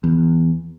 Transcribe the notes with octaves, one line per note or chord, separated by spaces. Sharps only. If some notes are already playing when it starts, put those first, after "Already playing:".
E2